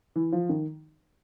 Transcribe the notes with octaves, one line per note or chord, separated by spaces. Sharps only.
E3
F3
D#3